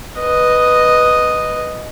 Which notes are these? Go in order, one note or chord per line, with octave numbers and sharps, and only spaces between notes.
B4 D#5